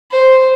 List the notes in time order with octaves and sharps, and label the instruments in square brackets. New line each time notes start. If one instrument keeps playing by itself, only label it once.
[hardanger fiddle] C5